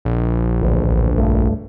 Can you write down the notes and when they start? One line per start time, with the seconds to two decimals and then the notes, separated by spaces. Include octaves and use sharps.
0.05 A#1
0.62 A1 D2
1.18 C#2 G2 A3